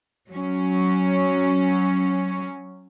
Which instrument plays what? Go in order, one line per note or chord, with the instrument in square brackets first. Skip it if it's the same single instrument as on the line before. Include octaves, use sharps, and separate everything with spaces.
[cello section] F#3 C#4